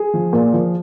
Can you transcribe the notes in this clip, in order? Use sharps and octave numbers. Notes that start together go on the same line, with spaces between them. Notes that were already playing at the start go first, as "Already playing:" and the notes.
Already playing: G#4
F3
A#2
F3